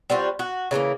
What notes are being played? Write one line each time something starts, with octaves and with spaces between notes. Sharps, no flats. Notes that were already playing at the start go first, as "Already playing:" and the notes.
G3 C4 F4 F#4
F#4
C#3 E3 A3 A#3